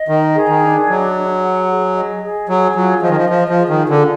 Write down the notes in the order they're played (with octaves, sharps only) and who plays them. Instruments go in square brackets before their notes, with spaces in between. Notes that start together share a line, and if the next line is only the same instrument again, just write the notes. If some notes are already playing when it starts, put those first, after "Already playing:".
Already playing: [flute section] D#5
[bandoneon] D#3 [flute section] A#5
[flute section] G#4
[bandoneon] D#3
[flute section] D4
[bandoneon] F#3 [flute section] D#5
[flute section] G#4
F#5
G#4
D#5
G#4
[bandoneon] F#3 [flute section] G#4
[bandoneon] F#3 [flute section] F4
[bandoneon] F3 [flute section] D#5
[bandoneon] D#3
F3
[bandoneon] F3 [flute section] F4
[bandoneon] F3
[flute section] G#4
[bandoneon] D#3
[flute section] F4
[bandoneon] D3